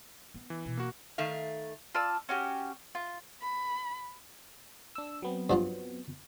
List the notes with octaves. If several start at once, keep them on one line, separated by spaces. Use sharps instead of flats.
B3
E3
B2
A#3 F#4
D#3 A3 F5
F4 D5 A5 E6
C#4 F#4 G4
F4
B5
D4 E6
F#3 B3 C4
G2 F3 F4